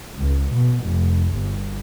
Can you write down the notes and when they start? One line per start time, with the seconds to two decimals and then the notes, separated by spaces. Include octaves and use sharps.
0.17 C#2
0.55 B2
0.85 F1
1.37 G1